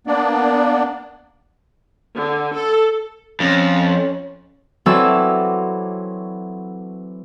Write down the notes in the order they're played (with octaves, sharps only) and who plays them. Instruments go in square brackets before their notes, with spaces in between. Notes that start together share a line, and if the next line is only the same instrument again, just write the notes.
[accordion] A#3 B3 D4 D5
[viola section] D3
A4
[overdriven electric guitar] F2 [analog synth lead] C#4
[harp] E3 F#3 C4 A4 D5 E6